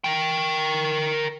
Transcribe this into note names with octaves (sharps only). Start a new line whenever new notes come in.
A#4 G5